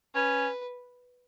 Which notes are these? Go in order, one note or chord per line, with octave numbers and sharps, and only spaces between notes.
C#4 B4